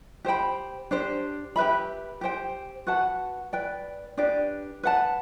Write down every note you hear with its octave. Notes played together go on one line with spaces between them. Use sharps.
G4 C5 G5 B5
D4 G4 C5
G4 B4 E5 B5
G4 C5 G5
F#4 B4 F#5 A5
B4 D5 G5
D4 G4 B4 D5
B4 F#5 A5